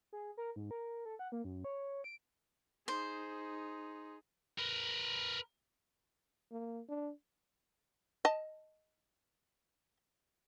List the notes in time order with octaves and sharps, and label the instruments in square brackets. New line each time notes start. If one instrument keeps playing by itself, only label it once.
[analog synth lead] G#4
A#4
G#2
A#4
A4
F#5
A#3
F#2
C#5
D7
[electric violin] D#4 G#4 [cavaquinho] C5
[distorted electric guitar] A#4 B4
[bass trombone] A#3
D4
[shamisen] D#5 A5